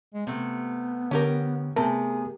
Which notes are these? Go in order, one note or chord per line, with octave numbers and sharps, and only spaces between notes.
G#3
C3 A3 B3
D3 C#4 G4 A#4
C3 A3 B3 G#4 A#4